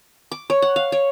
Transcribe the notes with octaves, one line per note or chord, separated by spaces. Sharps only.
D6
C#5
F#5
F5
C#5